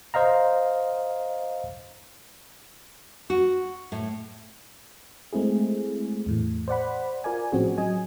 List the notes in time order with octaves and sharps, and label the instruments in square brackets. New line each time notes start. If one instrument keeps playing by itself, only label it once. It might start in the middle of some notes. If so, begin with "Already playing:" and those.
[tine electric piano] C5 D#5 F5 A#5
[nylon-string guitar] F#4
A2
[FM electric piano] G#3 A3 C4 E4 G#4
E2 A2 E3
C5 D5 F#5 B5
F4 A#4 D5 G#5
A2 F3 C4 C#4 F#4 G#4
F#3 D#5 G#5